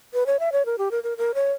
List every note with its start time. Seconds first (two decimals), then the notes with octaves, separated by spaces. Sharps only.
0.14 B4
0.26 C#5
0.40 E5
0.52 C#5
0.66 A#4
0.78 G4
0.91 A#4
1.03 A#4
1.18 A#4
1.34 C#5